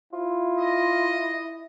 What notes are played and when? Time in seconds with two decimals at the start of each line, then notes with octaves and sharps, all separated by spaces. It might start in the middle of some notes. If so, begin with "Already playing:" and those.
0.13 E4 F4
0.58 D#5